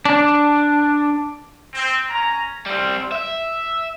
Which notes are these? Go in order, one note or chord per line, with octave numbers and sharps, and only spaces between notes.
D4
C4
C#4 A#5
G3 C4
E5